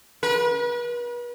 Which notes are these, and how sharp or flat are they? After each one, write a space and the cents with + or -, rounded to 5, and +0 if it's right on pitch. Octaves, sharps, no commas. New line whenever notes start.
B4 -40